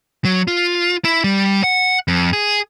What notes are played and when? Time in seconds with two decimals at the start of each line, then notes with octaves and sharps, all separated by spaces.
0.25 F#3
0.48 F4
1.05 E4
1.24 G3
1.64 F#5
2.08 F2
2.33 G#4